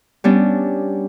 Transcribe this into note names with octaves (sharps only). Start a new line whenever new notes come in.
G3 B3 C#4 D4